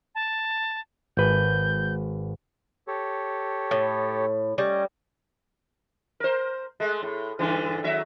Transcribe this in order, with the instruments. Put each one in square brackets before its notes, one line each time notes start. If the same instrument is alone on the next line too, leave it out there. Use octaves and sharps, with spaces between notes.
[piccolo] A5
[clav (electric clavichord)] G#1 B4 [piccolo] G6
[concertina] G4 A4 C#5
[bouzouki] A2
[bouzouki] G3 [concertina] C#4 D#5 G#5
[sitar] A#4 C5
G#3 A3
A2
G2 D3 E3
D#2 F#3 E5